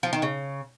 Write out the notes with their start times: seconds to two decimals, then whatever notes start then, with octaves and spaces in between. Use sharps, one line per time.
0.03 F3
0.13 D#3
0.22 C#3